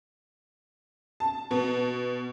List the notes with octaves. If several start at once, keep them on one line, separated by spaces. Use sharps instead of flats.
A5
B2